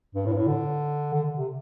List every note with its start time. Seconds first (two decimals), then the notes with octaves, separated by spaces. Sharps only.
0.15 G2
0.26 A2
0.32 G2
0.36 A2
0.48 D3
1.14 D3
1.26 D3
1.37 C3